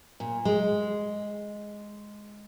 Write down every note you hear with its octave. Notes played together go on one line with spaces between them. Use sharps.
A#2
G#3